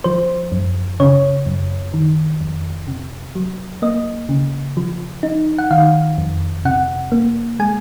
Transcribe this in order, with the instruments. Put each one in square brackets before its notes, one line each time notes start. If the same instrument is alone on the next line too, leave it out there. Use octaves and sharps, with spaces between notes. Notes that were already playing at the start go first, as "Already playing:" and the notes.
[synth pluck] F3 C5
F#2
C#3 C#5
F#2
D#3
F2
C3
F#3
A#3 D#5
C#3
F3
D#4
F#5
D#3 F5
F2
C3 F#5
A#3
G#3 G#5